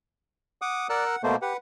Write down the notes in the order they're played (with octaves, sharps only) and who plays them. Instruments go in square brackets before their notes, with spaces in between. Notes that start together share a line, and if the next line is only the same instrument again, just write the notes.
[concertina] F#5 D6 D#6
[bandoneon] A#4 E6 F#6 [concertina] D5 F#5
[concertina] F#5
[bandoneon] B2 A3 A#3 [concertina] C5
[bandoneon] G4 [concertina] B4 F#5